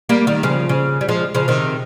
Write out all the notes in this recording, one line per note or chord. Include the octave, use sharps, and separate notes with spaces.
G3 A#3
D#3 G3
C#3 F3
C#3
G3
F3 G#3
C#3 F3
C3 D#3